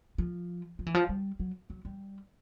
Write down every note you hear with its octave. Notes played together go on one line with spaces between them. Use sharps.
F3
F3
E3
F3
G3
F#3
F#3
G3